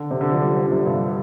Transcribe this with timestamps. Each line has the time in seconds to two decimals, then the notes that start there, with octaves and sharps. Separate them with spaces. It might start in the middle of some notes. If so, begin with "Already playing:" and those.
Already playing: D3
0.11 C3
0.21 D3
0.32 F3
0.42 G3
0.56 F3
0.66 D3
0.72 C3
0.86 G2